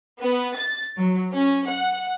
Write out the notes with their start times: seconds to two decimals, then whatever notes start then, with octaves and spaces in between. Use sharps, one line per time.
0.20 B3
0.56 A6
0.98 F#3
1.34 C#4
1.68 F#5